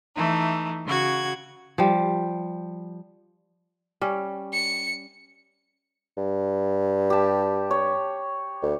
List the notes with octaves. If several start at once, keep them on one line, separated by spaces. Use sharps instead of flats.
E3 A3 D#4
C#3 F#4 F#5 G#6
F3 G3
G3 C#4
C#7
G2
G4 A5
C#5
D2